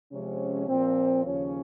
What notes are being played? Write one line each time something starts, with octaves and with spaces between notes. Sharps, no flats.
C3 F3 G#3 C#4
A#2 F3 A#3 C4
D#2 C#3 F3 C#4